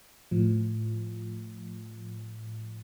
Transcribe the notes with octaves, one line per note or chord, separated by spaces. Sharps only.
A2 F3